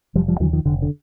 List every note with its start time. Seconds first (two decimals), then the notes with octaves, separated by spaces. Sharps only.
0.15 F1 F3 G3
0.28 F3 G3
0.40 D#2 D3 E3 F#3
0.53 D#3 F3
0.65 F1 D3
0.82 D3